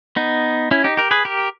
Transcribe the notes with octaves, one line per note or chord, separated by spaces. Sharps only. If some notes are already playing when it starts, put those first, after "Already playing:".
B3 D#4
C#4 E4
D#4 G4
G4 A#4
G#4 B4
G4 A#4